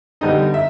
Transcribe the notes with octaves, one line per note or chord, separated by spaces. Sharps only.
D3 G3 B3 D#4 D#5
E5